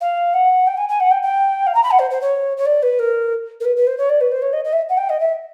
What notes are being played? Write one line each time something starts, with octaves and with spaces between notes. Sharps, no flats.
F5
F#5
G5
G#5
G#5
F#5
G5
G5
F5
A#5
B5
F#5
C5
C5
C#5
C#5
D5
B4
A#4
A#4
B4
B4
C5
C#5
D5
B4
C5
C#5
D#5
D#5
E5
F#5
G5
D#5
E5